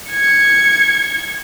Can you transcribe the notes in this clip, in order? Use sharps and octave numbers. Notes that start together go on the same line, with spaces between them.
G#6 C#7